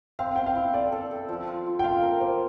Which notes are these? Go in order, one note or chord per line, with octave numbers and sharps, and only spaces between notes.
C4 F5
C4 G5
F5
E4
A4 D5
A4
A4
F3
F4
F4
G5
F4 F5
A#4
A#3 C5